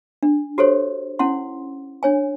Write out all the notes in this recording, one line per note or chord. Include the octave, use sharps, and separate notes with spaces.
D4
F#4 G4 A4 C5 C#5
C#4 E4 F#5 C6
D4 C#5 G#5